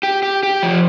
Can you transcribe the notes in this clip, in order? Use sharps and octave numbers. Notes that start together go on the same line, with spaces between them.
G4
G4
G4
F3